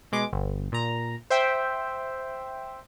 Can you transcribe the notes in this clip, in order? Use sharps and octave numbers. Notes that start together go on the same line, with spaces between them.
B2 G#3 D6
G1
A#2 A#5
C5 E5 G5